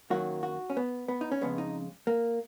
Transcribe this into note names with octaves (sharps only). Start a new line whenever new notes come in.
F#2 D#3 F#3 A#3 F#4
F#4
C#4
B3
B3
D#4
C#4
F2 C#3 G#3 B3
D#4
A#3